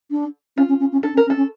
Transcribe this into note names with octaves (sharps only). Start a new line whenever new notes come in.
D4
C#4 F4
C#4
C#4
C#4
D4 A4
C#4
A#4
C#4
A4
C#4